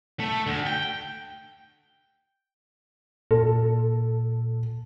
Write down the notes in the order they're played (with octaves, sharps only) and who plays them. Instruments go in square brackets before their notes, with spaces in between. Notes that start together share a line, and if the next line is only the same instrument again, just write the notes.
[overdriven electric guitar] A3
D2
G5
[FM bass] A#2 [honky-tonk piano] A4